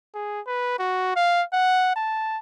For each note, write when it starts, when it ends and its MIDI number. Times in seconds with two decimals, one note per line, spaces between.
0.14 0.41 68
0.47 0.76 71
0.79 1.13 66
1.16 1.43 77
1.53 1.94 78
1.96 2.39 81